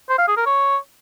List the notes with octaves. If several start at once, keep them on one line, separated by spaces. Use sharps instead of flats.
C5
F5
G#4
A#4
C#5